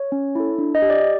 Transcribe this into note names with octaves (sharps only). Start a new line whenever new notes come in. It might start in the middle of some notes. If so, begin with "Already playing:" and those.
Already playing: C#5
C#4
E4 A4
D4
D#5
G4
D5